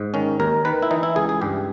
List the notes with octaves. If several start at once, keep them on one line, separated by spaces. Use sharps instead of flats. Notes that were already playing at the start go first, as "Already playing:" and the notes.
Already playing: G#2
D#3 C#4
D#2 A#4
D#3 B4
E4
E3 D#4
E4
C#2 G#4
G#4
G2 G4